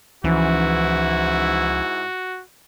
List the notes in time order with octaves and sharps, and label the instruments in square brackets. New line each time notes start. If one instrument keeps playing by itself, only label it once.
[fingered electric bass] C#2 F3 C#4 [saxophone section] G#2 E4 [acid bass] E3 [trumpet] F#4